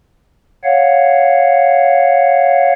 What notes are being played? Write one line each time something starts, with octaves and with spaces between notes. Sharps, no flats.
C#5 F5 F#5